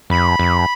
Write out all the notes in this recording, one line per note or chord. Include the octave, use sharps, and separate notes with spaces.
F2 B5
F2